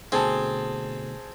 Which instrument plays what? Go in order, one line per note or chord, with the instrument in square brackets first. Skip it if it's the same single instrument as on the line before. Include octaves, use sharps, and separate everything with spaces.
[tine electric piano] B2 D3 A3 [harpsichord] C4 [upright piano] G#4 A5